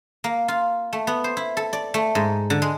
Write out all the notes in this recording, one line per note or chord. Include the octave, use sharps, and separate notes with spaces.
A#3
F4
A3
B3
C5
E4
A4
D5
A3
G#2
D3
G#3